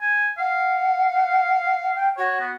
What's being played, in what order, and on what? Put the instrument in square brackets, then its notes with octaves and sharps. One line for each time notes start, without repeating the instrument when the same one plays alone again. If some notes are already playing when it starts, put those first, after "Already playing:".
[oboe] G#5
[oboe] F5 [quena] F#5
[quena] G5
[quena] F#4 [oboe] C#5
[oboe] B3